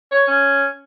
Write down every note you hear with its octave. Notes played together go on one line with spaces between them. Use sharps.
C#5
C#4